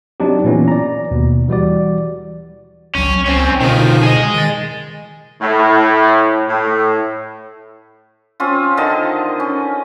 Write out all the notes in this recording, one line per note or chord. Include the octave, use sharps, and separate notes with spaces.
F#3 C4 D4 D#4 G4
A#2 E3 B3 C#4 E4
D5 A#5
D#2 B2
E3 G3 F#4 D5
G#1 C#2 F#3 C#4
C#2 C4 C#4
B2 D3 D#3 F3
G#4 D#5
D#3 A6
A2
A2
C4 C#4 F4
D3 D#3 D#5 A5
C#4